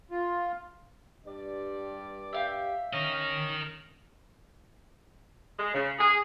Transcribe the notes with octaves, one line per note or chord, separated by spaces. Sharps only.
F4
G2 G3 D5
G4 E5 F5 G5
C#4 A#4 D#5
G#3
C#3
G#4